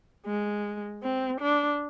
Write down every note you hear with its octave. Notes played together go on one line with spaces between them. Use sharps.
G#3
C4
D4